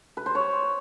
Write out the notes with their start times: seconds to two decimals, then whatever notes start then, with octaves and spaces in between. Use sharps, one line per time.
0.17 B4
0.26 C5
0.35 C#5